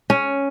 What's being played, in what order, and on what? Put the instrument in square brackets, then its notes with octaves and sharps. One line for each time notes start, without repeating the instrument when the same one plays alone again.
[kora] C#4